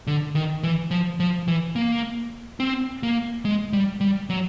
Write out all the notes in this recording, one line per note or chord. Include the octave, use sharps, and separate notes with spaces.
D3
D#3
E3
F3
F3
E3
A#3
C4
A#3
G#3
G3
G3
F#3